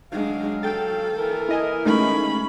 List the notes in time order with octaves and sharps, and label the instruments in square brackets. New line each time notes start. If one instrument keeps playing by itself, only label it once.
[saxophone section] F#3 F5 [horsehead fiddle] G#3 D4
[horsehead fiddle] A4 [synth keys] G5 A6
[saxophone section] E3 A#3 A#4
[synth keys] E4 D#5 G#5
[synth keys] G#3 A3 D#4 [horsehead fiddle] C#4 B5